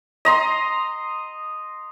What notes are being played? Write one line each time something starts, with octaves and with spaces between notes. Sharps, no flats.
D#5 A#5 C6